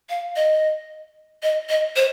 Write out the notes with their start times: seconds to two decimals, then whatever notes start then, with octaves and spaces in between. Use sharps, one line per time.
0.10 F5
0.36 D#5
1.43 D#5
1.69 D#5
1.96 C5